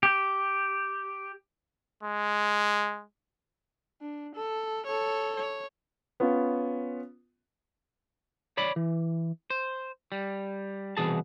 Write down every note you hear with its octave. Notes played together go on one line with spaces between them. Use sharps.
G4
G#3
D4
A4
A4 C#5
C#5
B3 C#4 F4
C#5 D5 B5
E3
C5
G3
C2 B2 E3 G#4 A5